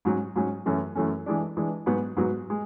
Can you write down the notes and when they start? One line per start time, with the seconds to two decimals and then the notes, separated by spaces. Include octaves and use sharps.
0.05 G#2 F#3 C#4
0.36 G#2 F#3 C#4
0.66 F#2 E3 A3 C#4
0.96 F#2 E3 A3 C#4
1.26 E3 G#3 D4
1.57 E3 G#3 D4
1.86 G#2 F#3 B3 F#4
2.17 G#2 F#3 B3 F#4
2.50 G#3